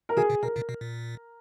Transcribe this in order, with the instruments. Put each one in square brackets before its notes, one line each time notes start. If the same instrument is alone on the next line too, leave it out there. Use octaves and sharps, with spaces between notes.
[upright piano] A#4
[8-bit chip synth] B2 D#3 [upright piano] G#4
[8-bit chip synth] A#2 C#3
[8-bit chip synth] B2 [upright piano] A#4
[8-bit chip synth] A#2 C#3
B2
A#2